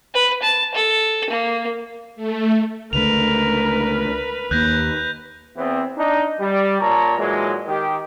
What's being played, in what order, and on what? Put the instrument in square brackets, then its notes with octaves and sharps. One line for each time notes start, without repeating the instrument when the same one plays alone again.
[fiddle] B4
A5
A4
A#3
[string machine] A3
[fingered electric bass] C#2 D3 A3 [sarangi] A#4 [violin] B4 [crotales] F7
[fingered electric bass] D#2 A#3 [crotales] F#6 G6 A#6
[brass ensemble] E2 E3 B3 C4
D4 D#4
G3
A#2 C#5 A5 A#5
A#2 E3 F#3 G#3
D#3 G4